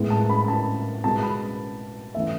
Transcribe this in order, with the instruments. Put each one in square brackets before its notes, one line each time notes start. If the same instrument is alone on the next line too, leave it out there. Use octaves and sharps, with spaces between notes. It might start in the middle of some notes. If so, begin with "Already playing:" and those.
Already playing: [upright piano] A2 G#3 B3
A5
B5
A5
B2 G#3 B3 A5
B5
E3 A3 C#4 E5